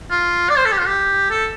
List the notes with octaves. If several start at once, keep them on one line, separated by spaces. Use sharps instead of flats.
F4
D5
C5
A4
G4
F4
G4
A4